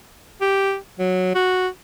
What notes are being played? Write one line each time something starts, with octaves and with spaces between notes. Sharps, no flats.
G4
F#3
F#4